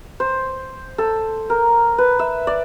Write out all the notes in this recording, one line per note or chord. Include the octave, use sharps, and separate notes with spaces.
C5
A4
A#4
B4
E5
D5